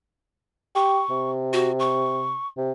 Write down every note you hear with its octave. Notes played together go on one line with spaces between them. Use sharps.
G4 C#6
C3
F#4
C#6
C3